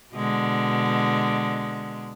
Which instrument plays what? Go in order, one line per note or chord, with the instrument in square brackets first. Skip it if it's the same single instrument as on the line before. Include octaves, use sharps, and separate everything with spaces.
[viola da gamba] B2 D3 G#3